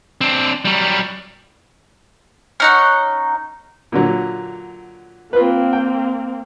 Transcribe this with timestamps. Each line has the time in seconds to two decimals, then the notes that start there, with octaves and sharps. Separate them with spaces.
0.21 C4 D4
0.65 F#3 G3
2.60 C#4 D#4 F#5
3.92 A#2 D3 F#3
5.33 A#3 C4 F4 B4
5.73 G5